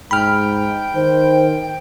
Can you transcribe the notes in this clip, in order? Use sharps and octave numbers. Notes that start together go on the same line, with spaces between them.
G#2 G5 B5 F6
D#3 C5